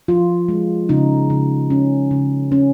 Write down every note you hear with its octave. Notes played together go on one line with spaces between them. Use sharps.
F3 F4
G#3
C#3 D#4
C#3
C#4
C#3
C#4